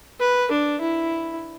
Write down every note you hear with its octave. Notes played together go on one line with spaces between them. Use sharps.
B4
D4
E4